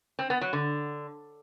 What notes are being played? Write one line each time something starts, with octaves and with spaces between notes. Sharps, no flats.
C4
B3
F#3
D3